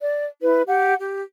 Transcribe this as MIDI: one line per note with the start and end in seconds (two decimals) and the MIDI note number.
0.02 0.26 74
0.42 0.62 64
0.42 0.62 71
0.66 0.94 67
0.66 0.94 78
1.00 1.21 67